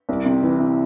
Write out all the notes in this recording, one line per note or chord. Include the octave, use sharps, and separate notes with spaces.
C2
C3
E3
C3